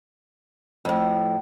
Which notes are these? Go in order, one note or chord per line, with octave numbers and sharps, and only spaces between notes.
F2 A2